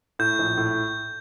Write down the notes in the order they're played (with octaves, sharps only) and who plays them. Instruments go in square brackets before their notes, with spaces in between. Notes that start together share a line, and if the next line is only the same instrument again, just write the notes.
[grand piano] A2 [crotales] G6
[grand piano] A#1
A2